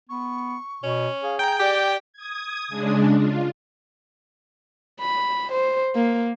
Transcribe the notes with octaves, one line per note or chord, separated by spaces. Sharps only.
B3 C#6
B2 C#4
G#4 F5
G5 A#5
G4 D5
D#6 G#6
C#3 G#3 D4
F4
B5
C5
A#3